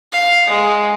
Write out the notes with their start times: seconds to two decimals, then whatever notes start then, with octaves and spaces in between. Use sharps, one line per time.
0.12 F5
0.47 G#3